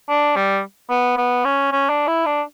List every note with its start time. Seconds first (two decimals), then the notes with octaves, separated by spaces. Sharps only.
0.09 D4
0.36 G3
0.90 B3
1.17 B3
1.45 C#4
1.72 C#4
1.89 D4
2.07 E4
2.26 D4